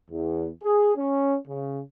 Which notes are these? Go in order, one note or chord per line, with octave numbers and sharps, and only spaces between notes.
E2
G#4
C#4
C#3